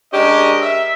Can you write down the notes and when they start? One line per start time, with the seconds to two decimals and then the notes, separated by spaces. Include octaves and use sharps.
0.13 G#3 C#4 D4 G4 A#4 D#5
0.62 E5